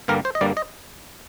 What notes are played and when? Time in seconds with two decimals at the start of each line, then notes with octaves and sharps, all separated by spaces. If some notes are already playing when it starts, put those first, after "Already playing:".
0.08 G2 D3 G3 A#3 A#4
0.25 C5
0.35 D#5
0.41 G2 D3 G3 A#3 D5
0.57 D#5